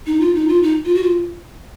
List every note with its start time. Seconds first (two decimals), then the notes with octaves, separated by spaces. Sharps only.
0.06 D#4
0.20 F4
0.35 D#4
0.48 F4
0.63 D#4
0.85 F4
0.95 F#4
1.03 F4